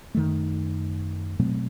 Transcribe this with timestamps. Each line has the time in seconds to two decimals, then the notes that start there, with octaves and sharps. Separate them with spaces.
0.15 F#2 D#3 A3
1.40 B2 F#3 A3 C4